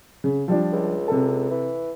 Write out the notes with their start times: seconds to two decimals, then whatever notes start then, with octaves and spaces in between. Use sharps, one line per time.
0.24 C#3
0.48 F3 G3 D4
0.72 C#2
1.08 C3 A4
1.51 E3